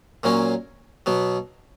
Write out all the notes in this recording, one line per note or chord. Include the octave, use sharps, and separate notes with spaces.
A#2 F#3 A#3 C#4
B2 F#3 B3